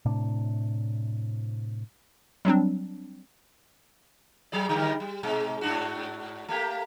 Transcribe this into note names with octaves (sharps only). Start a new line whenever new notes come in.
A2 C3 D4
F#3 G3 C4 D4
F#3 G#4 D5
D3 D#3 G3
G3
G#2 B2 G#3
G#2 D4 F#4
A3 A#3 G4